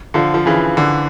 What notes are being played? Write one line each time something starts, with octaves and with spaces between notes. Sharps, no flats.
D3 F3
F3
C#3 E3
D3